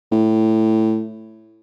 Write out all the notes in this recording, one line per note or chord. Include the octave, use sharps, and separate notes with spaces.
A2